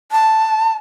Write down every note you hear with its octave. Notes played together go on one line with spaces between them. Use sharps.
A5